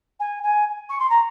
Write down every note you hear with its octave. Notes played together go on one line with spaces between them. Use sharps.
G#5
G#5
C#6
C6
A#5